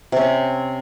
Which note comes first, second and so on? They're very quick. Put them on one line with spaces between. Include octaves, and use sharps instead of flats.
C3 C#4 C4